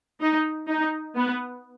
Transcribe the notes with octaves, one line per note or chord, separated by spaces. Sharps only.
D#4
D#4
B3